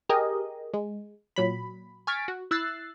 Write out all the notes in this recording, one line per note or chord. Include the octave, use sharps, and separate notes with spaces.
G4 G#4 A#4 D#5
G#3
A#2 F#3 B5
G#5 C#6 F6 A6 B6 D7
F#4
E4 E6 F#6 A6 C7